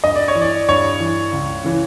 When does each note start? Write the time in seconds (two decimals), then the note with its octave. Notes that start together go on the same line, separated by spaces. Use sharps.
0.04 G2 D#5
0.16 D5
0.28 C#5
0.35 E3
0.41 D5
0.69 G2 C#5
1.00 E3
1.33 C#2
1.64 C#3 E3